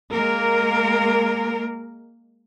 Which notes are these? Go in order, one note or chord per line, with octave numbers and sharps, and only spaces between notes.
G#3 A#3 A#4